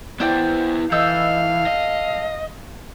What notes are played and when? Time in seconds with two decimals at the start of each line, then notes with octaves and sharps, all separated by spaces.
0.20 B3 E4 C5 D5 G5
0.92 E3 D#4 A4 F5 E6
1.67 D#5